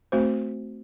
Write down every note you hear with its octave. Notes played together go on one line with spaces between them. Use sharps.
A3 C4 F#4 C5